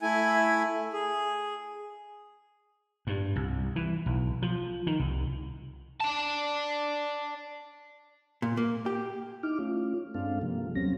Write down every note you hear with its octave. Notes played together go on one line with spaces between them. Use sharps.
A3 E4 G#5
G#4
G2
C2
E3
B1
F3
D#3
C2
D5 A5
A#2
A#3
G4
D#4 E4 D6 F6
A3 C#4 F4
G2 G#3 C4 D4 A4 F5
C3 F3 G3 A#3
D#2 F#3 G3 C4 C#4 A#6